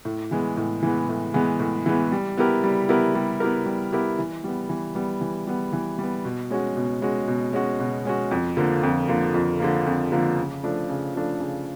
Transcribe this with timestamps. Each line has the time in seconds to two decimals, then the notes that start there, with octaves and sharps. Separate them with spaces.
0.05 A2
0.31 E3 G#3 B3
0.57 A2
0.83 E3 G#3 B3
1.09 A2
1.34 E3 G#3 B3
1.60 A2
1.86 E3 G#3 B3
2.12 G3
2.38 B3 E4 G4 A#4
2.63 G3
2.89 B3 E4 G4 A#4
3.15 G3
3.40 B3 E4 G4 A#4
3.66 G3
3.92 B3 E4 G4 A#4
4.19 E3
4.44 G3 B3
4.69 E3
4.95 G3 B3
5.21 E3
5.47 G3 B3
5.73 E3
5.99 G3 B3
6.25 B2
6.51 G#3 C#4 F#4
6.77 B2
7.02 G#3 C#4 F#4
7.28 B2
7.53 G#3 C#4 F#4
7.80 B2
8.05 G#3 C#4 F#4
8.31 F2
8.57 D3 F3 A#3
8.83 F2
9.08 D3 F3 A#3
9.34 F2
9.60 D3 F3 A#3
9.86 F2
10.12 D3 F3 A#3
10.38 C#3
10.63 F3 A3 D4
10.89 C#3
11.14 F3 A3 D4
11.40 C#3